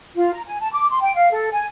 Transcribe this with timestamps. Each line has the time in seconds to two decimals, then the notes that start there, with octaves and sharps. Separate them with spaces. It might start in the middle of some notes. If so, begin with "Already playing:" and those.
0.16 F4
0.33 A#5
0.47 G#5
0.61 A5
0.73 D6
0.90 C6
1.02 G5
1.16 F5
1.31 A4
1.52 G#5